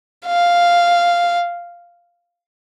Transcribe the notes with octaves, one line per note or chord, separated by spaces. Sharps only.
F5